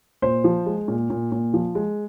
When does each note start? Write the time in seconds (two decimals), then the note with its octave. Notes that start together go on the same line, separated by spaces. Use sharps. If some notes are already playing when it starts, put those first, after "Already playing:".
0.22 A#2 C5
0.44 F3
0.66 G#3
0.88 A#2
1.10 A#2
1.32 A#2
1.54 F3
1.75 G#3